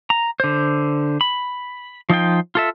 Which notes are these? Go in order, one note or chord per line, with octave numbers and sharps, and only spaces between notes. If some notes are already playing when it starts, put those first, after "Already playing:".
A#5
D3 C5
B5
F3 D#4 F4 G5
F4 A4 E5